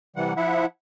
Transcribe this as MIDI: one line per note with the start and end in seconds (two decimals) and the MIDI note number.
0.16 0.33 48
0.16 0.33 52
0.16 0.33 55
0.16 0.33 78
0.37 0.66 53
0.37 0.66 64
0.37 0.66 76
0.37 0.66 78